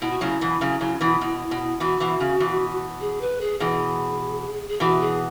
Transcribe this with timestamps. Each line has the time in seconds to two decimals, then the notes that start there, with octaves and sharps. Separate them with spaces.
0.01 B2 E4
0.11 F#4
0.21 C#3 F#3 E4
0.41 B2 E3
0.61 C#3 F#3
0.81 C#3 F#3
1.01 B2 E3
1.21 B2
1.51 B2
1.80 B2 E3 F#4
2.00 B2 E3
2.20 C#3
2.40 B2 E3
3.01 G#4
3.21 B4
3.41 G#4
3.60 B2 E3 G#4
4.69 G#4
4.80 B2 E3 F#4
5.01 G#4